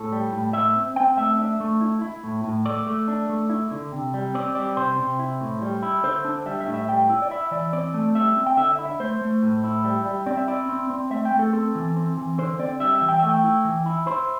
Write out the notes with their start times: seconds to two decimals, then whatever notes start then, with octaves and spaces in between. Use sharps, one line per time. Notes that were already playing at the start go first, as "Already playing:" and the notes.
Already playing: A2 A4
0.12 G3
0.33 A2
0.53 A2 E5
0.76 C4
0.96 C4 G5
1.17 A3 E5
1.39 D4 E5
1.60 A3
1.81 E4
2.01 E4
2.24 A2
2.44 A2
2.66 A3 D5
2.87 A3
3.08 D4
3.29 A3
3.49 E4
3.71 D3
3.92 C3
4.14 G3
4.34 C4 D5
4.55 G3 D5
4.77 C3 C5
4.98 C3
5.19 E4
5.41 A2
5.62 G3
5.82 E4
6.03 D3 C5
6.25 D4
6.46 G3 E5
6.60 E5
6.67 A2
6.74 E5
6.88 G3 G5
7.10 E4
7.22 D5
7.31 E4 E5
7.51 E3 D5
7.73 C4 D5
7.94 A3
8.15 G3 E5
8.37 C4
8.46 G5
8.57 D3 E5
8.72 E5
8.79 E4
8.85 E5
9.00 A3 C5
9.21 A3
9.43 A2
9.64 E4
9.85 G3
10.06 G3
10.26 C4 D5
10.37 E5
10.47 E4 D5
10.69 C4
10.90 C4
11.11 A3 E5
11.25 G5
11.32 A3
11.39 A4
11.53 C4 A4
11.75 E3
11.96 C4
12.17 E3
12.38 D3 C5
12.59 C4 D5
12.80 G3 E5
12.95 E5
13.01 E3
13.09 G5
13.19 A3 E5
13.29 G5
13.44 E4
13.64 E3
13.86 E4
14.07 E4 C5